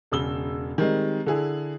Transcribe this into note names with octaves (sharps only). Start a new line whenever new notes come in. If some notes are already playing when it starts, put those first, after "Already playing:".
E1 C#3 E6 G7
D#3 G3 G#3 C4
D3 E4 G#4